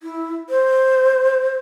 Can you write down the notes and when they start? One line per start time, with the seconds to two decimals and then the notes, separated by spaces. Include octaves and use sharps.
0.03 E4
0.49 C5